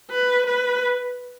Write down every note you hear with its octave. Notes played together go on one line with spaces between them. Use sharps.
B4
B4